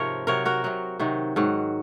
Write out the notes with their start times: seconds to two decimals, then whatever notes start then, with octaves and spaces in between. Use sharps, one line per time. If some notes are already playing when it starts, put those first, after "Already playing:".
Already playing: G#2 C3 F3 A#4 C#5
0.27 C3 F#3 A#4 C#5
0.45 F#4 A#4
0.64 C3 F#3
1.00 C3 D#3 F#3
1.36 G#2 D#3 F#3